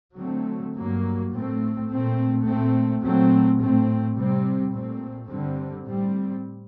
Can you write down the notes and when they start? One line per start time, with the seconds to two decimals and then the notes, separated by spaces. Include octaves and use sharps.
0.18 D3 F#3 A3 C4
0.75 G2 F#3 A#3
1.31 A2 A3 C4
1.88 A#2 A3 C4
2.45 A#2 A3 C4
3.01 A#2 F#3 A3 C4
3.58 A2 A3 C4
4.16 C3 G3 C4
4.72 A#2 A3 C4
5.28 G2 D3 G3 C4
5.85 A2 G3 C4